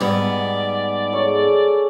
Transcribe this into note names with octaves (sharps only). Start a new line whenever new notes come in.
G#2 G3 B3 D5
G#4 A4 C#5